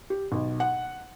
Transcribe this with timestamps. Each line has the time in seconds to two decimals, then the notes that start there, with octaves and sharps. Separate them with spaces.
0.10 G4
0.32 B1
0.60 F#5